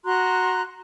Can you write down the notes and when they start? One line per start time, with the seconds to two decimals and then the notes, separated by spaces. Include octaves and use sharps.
0.05 F#4 A#5 C6 F#6